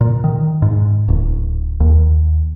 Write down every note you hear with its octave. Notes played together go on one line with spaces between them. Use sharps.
A#2
D#3
G#2
D1
D#2